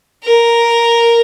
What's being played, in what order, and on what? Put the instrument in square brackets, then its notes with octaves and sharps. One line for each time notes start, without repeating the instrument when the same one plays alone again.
[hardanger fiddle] A#4